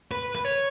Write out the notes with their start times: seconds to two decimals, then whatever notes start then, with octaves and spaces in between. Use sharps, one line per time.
0.11 B4
0.35 B4
0.45 C#5